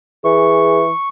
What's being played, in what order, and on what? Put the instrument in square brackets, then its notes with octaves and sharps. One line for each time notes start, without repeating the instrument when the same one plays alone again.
[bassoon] E3 [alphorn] G#4 [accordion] C#6